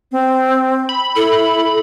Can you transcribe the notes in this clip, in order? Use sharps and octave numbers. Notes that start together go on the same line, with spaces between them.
C4
B5
E4 A4